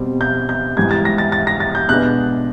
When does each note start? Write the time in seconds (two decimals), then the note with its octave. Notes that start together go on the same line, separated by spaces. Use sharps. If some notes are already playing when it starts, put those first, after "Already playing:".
Already playing: B2 G3 C4
0.21 G6
0.49 G6
0.77 G#2 E3 G3 G#6
0.91 A6
1.05 A#6
1.18 A6
1.32 A6
1.47 A#6
1.60 A6
1.75 G6
1.89 B2 G#3 B3 D4 F#6